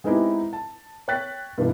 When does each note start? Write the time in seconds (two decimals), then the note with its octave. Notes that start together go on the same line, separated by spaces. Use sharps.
0.04 G#3 B3 C4 D#4 E4 G4
0.53 A5
1.08 C#5 G5 F#6 A6 B6
1.58 G2 B2 E3 A#3 D4